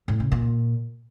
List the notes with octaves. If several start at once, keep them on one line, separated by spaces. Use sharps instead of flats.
A2
C#3
A#2